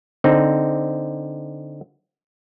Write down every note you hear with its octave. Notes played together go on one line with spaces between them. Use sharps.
D3 C4 D#4